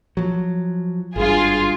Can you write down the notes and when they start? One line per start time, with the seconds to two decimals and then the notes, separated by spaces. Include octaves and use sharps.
0.17 F3 F#3
1.16 G#1 G2 F4 G#4